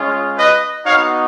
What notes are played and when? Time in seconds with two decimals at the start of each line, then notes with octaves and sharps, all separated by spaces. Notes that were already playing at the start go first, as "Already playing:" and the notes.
Already playing: G#3 C#4 F4
0.37 B4 D#5
0.84 B3 D#4 F#4 C#5 F5